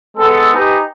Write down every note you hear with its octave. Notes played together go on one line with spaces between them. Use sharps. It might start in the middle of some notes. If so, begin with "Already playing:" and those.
G#3 B3 A4
D#4 G4 B4 C5 G#5